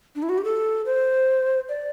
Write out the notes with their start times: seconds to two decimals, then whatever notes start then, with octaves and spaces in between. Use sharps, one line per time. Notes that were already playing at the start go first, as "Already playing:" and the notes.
0.16 D4
0.23 E4
0.29 F#4
0.38 G4
0.44 A4
0.86 C5
1.69 D5